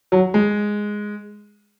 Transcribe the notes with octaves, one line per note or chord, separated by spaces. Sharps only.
F#3
G#3